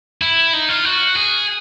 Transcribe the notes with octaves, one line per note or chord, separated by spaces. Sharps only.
E4
D#4
F4
F#4
G#4